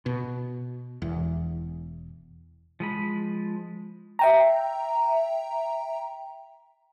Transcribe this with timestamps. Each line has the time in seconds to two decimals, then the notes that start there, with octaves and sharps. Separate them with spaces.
0.06 B2
1.02 E1 E2
2.80 F3 G#3 B5
4.19 E5 G5 A#5